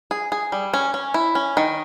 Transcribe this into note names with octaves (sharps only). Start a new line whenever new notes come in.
G#4
G#4
G3
C#4
C#4
E4
C#4
D#3